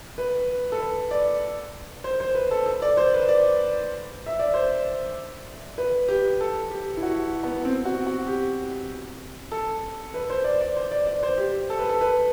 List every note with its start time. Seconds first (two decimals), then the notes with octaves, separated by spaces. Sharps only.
0.18 B4
0.72 A4
0.80 B4
1.11 D5
2.04 C5
2.20 C5
2.35 B4
2.51 A4
2.66 A4
2.82 D5
2.97 C5
3.13 B4
3.28 D5
4.26 E5
4.39 D5
4.54 C5
5.78 B4
6.08 G4
6.41 A4
6.71 G4
6.97 E4
7.03 F#4
7.43 B3
7.65 C4
7.86 F#4
8.07 F#4
8.27 G4
9.52 A4
10.14 B4
10.30 C5
10.44 D5
10.61 D5
10.76 C5
10.91 D5
11.07 D5
11.23 C5
11.38 G4
11.70 A4
11.79 B4
11.89 A4
12.01 B4